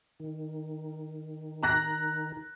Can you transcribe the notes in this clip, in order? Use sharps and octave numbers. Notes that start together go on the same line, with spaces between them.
D#3
A#5 F#6 A#6